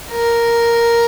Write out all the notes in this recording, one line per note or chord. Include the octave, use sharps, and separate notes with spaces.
A#4